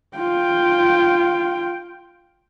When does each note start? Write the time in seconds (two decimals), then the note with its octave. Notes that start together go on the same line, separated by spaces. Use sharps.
0.17 F4 G5